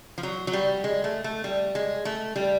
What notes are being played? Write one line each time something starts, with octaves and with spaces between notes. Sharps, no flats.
F3
F#3
F#3
G3
G#3
A3
A3
G3
G#3
A3
G3